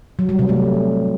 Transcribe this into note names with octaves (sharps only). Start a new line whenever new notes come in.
F#3
G3
C3
A3